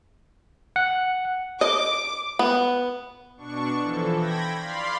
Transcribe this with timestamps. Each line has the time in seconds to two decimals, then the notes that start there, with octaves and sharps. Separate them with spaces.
0.76 F#5
1.61 D#5 D6
2.39 B3
3.37 B2 D4 C#6
3.81 E3 F3 A4
4.17 G5 B5 G#6 A#6
4.58 D5 F5 B5 C6